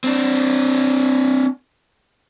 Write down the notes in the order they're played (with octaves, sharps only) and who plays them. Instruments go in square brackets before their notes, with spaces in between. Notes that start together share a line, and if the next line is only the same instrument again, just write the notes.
[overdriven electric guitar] C4 D4